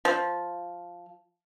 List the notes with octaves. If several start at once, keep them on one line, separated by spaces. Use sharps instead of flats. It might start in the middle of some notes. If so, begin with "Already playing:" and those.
F3